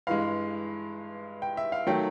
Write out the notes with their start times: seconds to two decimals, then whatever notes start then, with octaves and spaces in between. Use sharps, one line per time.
0.07 G2 E3 G#3 F5
1.42 G5
1.57 E5
1.72 F5
1.87 D#3 F#3 A3 G5